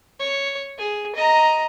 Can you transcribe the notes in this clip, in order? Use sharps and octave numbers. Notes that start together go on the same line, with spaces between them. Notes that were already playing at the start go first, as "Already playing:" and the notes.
C#5
G#4
D#5 A#5